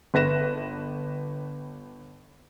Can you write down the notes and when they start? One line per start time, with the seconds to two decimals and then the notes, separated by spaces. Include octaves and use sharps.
0.14 G1 B4 A#6 E7